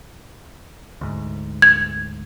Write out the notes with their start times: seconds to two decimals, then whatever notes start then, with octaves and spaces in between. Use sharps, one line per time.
1.01 D2 G#2
1.62 G#6